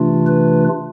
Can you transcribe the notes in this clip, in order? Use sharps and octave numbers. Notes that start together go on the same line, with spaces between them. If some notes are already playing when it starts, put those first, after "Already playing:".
Already playing: C3 E3 A3 D4 F4
B4